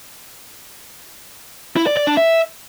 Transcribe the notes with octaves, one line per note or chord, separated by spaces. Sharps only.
E4
D5
D5
D4
E5